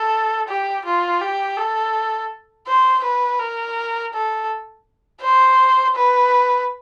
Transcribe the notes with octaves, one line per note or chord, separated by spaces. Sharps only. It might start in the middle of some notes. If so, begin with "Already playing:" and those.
Already playing: A4
G4
F4
G4
A4
C5
B4
A#4
A4
C5
B4